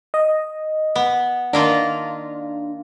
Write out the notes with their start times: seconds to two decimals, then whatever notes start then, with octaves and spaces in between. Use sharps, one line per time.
0.14 D#5
0.96 B3
1.53 D#3 A#3 D4 F4